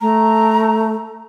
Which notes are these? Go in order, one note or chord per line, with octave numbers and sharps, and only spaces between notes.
A3 A#5